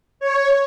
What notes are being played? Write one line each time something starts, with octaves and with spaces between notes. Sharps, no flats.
C#5